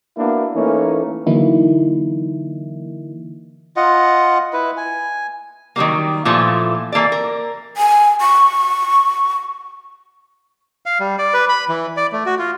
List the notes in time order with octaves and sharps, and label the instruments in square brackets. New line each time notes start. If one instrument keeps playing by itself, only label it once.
[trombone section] A#3 B3 D4 E4 F#4
E3 A3 A#3 C#4 D#4
[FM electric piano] D3 E3 F#3 A#3 D#4 E4
[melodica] F4 D#5 F#5
E4 B4
G#5
[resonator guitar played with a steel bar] D#3 F#3 G3 A#3
A#2 E3 F3 A3
E3 A#3 A4 D5
A#4
[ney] G#5
C#6
[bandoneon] F5
G3
D5
B4
B5
E3
D5
A3
F#4
F4